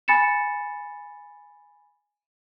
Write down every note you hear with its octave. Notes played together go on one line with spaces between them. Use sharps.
G#5 B5 A6 C#7 E7